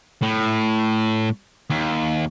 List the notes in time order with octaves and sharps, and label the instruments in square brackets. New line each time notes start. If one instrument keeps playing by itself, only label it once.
[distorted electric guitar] A2
D#2